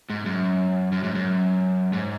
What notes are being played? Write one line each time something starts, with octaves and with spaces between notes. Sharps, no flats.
G#2
F#2
F#2
G#2
F#2
G#2